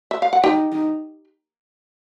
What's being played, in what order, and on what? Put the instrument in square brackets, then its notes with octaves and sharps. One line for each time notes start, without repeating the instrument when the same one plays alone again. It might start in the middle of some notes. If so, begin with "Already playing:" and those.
[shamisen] E5
F5
F#5
[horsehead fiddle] D#4 [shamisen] G4 G5
[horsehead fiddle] D#4